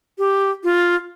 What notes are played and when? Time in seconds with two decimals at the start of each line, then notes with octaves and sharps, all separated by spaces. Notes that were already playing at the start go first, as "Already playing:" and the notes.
0.18 G4
0.64 F4